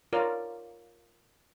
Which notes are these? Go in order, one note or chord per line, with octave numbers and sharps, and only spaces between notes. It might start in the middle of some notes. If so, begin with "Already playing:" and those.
F4 A#4 C#5 D5